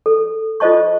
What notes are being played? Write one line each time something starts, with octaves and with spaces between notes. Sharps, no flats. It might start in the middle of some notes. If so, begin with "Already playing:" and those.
A4
F4 A4 C5 D#5 A5 C#6